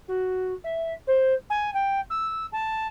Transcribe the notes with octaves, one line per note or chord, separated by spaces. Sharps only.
F#4
E5
C5
G#5
G5
E6
A5